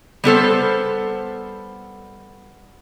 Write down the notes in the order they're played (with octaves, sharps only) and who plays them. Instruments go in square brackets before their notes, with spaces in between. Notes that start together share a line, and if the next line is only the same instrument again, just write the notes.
[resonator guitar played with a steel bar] G3 B3 A4 C5